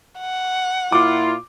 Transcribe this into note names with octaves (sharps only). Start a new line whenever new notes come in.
F#5
A#2 E4 F4 D6